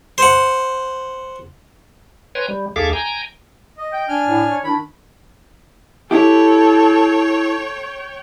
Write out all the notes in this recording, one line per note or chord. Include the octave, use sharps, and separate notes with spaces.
C5 F#5
B4 C#5 G5 G#5 A#5 C6
G3
D#2 G#4 A4 E5 F5 D6
G5 G#5 A#5
D#5
G5
D4 G#5 F6
A2
C#5
D#3 D4 E4 B5
E4 G4 A4 C#5 G5